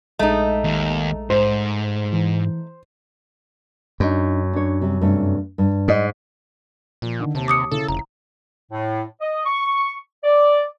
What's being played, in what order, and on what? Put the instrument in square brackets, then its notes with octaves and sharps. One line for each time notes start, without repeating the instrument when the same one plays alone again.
[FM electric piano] A#1 G#3 D#5 [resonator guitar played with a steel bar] A3 D#4
[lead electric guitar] D#2
[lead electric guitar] G#2 [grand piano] C5
[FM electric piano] E3
[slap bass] F#2 [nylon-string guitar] D4 D#4
[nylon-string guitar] D4 C#5
C3 G3
G2 C3 A3
G2
[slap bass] G#2 [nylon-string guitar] D5 D#5
[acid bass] A#2 [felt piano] F3
[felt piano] D3 D#3
[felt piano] D#2 A5 [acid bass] C3
[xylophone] D6 D#6 C#7
[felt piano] C#3 E4 [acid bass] A4
[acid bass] F1 [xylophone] A#5
[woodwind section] A2
D#5
C#6
D5